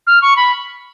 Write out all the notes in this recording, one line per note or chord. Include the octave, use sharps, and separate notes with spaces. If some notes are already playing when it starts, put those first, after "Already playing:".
F6
C#6
B5